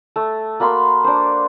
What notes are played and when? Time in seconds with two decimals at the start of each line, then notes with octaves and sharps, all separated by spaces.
0.16 A3
0.60 A#3 F#4 B5 C6
1.04 D4 C5